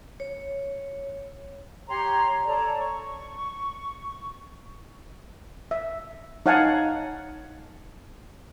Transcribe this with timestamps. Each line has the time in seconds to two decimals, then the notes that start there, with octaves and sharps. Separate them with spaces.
0.20 C#5
1.89 G4 C#5 A#5 C6
2.46 A4 C#5 D5 A#5
2.79 C#6
5.71 E5
6.46 D#4 C#5 F5 F#5 G#5 A5